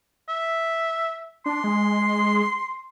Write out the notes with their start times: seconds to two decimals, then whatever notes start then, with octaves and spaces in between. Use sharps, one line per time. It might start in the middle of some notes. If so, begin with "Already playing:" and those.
0.29 E5
1.46 D4 C6
1.64 G#3